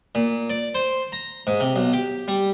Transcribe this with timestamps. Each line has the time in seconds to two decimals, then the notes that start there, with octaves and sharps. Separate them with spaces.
0.15 A#2
0.50 D5
0.75 C5
1.12 A#5
1.47 G#2
1.60 C3
1.76 B1
1.93 G4
2.28 G3